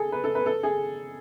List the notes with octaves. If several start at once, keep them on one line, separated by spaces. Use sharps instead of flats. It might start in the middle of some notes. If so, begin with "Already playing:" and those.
Already playing: G#4 A4
B4
A4
B4
A4
G#4